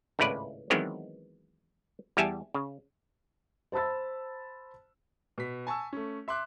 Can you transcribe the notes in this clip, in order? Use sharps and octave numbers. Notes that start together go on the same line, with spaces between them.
G#1 C#2 A2 E4 B4 D5
D#3 E3 F#3 G#3 B3 C4
E2 G3 G4 E5 G#5 A5
C#3
C5 A5 B5 E6 A6
B2 B6
G#5 A5 C#6 E6
A3 C#4
E5 C6 D6 F#6